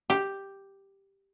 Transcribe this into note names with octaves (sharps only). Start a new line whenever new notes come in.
G4